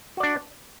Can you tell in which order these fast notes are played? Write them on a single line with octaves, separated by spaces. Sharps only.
F#4 D5 D4